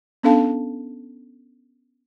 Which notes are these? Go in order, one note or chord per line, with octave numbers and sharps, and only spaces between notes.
B3 C#4 D4 A4 F5 A5